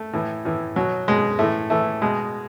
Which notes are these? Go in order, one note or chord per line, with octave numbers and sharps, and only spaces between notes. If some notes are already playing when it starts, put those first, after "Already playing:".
Already playing: A3
A2 E3
A2 E3
B2 F#3
B2 G#3
A2 E3 A3
A2 E3 A3
B2 G#3